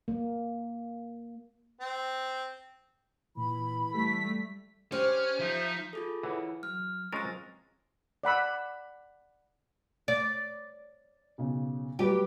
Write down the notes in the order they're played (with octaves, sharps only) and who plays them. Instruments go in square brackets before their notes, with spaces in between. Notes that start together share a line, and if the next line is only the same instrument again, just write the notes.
[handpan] A#3
[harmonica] C4
[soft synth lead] A#2 [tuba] E3 [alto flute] B5
[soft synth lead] G3 [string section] A3 B6
[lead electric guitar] C#4 [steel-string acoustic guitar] G4 C5 D5 [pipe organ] F6
[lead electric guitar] F3 [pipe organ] D#4 E5
[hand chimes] F4 G#4 A4
[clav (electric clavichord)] E3 [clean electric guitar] E4 C#5 F#5
[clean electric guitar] F#3 [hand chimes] F6
[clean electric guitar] F#3 C4 F4 [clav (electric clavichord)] G#3 C#4 A#4 [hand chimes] A6 A#6
[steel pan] D5 F#5 B5 E6
[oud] D5
[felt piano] B1 C#3
[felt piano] F#3 G3 B4 [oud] G4